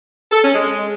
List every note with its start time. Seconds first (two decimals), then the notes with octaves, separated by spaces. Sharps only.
0.31 A4
0.43 C#4
0.54 G#3